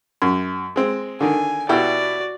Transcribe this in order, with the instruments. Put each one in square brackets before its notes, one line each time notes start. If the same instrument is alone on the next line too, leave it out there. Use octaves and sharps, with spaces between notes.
[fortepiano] F#2
G#3 C4
[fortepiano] D3 D#3 [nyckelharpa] G#5
[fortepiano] B2 E4 G4 [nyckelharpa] F#4 D5